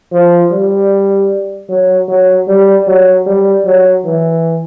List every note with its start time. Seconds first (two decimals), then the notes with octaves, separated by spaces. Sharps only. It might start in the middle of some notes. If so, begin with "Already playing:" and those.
0.13 F3
0.51 G3
1.69 F#3
2.08 F#3
2.48 G3
2.87 F#3
3.26 G3
3.66 F#3
4.05 E3